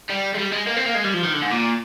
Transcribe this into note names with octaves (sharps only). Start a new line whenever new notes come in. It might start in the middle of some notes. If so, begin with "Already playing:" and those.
G3
G#3
G3
G#3
A#3
C4
A#3
G#3
G3
F3
D#3
D3
G#2
A#2